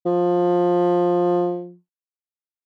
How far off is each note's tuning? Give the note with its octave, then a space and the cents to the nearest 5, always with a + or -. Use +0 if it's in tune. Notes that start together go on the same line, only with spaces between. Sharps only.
F3 +15